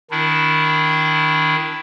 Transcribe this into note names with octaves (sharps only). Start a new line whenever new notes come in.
D#3 D4 E4